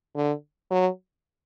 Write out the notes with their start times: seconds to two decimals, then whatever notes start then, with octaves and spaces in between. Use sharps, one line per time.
0.15 D3
0.71 F#3